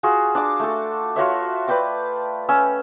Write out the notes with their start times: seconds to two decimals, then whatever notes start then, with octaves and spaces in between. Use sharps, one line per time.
0.03 F4 F#4 G#4
0.35 D4 D6
0.60 A3 A4
1.16 F4 F#4 C#5 E5
1.68 B4 D5 G5 A5
2.49 C#4 E6